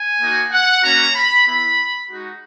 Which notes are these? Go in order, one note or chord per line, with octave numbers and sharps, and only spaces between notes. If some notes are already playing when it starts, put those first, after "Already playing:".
Already playing: G#5
A#3 D#4 F#4
F#5
A#3 C#4 F#4 A#5
B5
B3 E4 B5
G#3 D#4 F#4